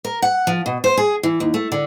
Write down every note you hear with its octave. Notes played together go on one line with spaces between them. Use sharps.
A#4
F#5
F3
B2
C5
G#4
E3
D#2
A3
D3